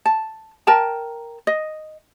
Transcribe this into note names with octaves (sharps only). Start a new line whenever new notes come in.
A5
A#4 G5 A5 A#5
D#5